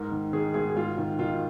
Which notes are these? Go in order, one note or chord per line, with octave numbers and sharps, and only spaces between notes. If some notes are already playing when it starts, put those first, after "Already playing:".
Already playing: G#2 A#4
D#3
D#3 G#4
G#2 G#4
G#4
G#2 F4
D#3
D#3 F4